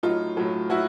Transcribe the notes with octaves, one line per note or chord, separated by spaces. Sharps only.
A2 F#3 D#4 F4
A2 F#3
F#3 E4 F#4